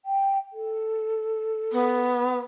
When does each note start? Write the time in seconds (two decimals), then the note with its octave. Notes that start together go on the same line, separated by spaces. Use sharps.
0.05 G5
0.53 A4
1.72 B3